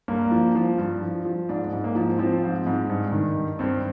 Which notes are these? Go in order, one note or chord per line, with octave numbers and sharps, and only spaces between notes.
G2 A#3
F3
F3
G2
F3
F3
G#2 D4
G#2
A#3
F3
F3 C4
G#2
G#2
G2
D#3
G2
G2 C4